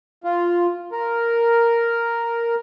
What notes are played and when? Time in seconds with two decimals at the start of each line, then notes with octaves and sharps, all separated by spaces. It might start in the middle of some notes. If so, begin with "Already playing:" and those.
0.24 F4
0.92 A#4